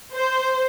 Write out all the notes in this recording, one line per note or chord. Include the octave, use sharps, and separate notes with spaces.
C5